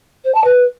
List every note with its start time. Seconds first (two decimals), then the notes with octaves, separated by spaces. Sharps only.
0.25 C5
0.35 A5
0.44 B4